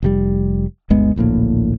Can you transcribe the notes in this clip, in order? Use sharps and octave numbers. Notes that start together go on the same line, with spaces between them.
F1 B2 G3
G1 D2 G#3 B3
D1 A#1 A2 A#3